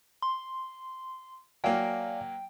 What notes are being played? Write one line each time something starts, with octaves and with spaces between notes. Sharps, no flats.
C6
F#3 A#3 D5 F5 G5 G#5